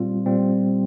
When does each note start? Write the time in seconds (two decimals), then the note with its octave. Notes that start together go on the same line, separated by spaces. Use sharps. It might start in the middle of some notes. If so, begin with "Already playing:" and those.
Already playing: A#2 G3 C4 F4
0.26 A#2 G3 C4 F4